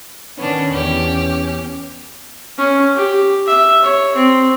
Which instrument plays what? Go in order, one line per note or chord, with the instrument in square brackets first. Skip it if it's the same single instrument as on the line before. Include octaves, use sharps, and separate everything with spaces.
[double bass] D#3 [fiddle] B3 D4 [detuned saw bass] C#4
[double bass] E2 [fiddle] G4
[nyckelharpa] C#4
G4
E5
C#5
C4